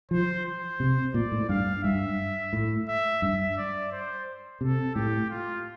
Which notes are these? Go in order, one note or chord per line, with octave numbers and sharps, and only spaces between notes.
F3 C5
C5
C3
A#2 D5
A2
G2 F5
G2 E5
A2
E5
G2 E5
D5
C5
C3 A4
A2 G4
F4